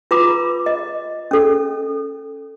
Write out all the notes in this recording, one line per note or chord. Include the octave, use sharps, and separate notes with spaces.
F4 B4 A#5 B5 D6
D#5
C#4 A4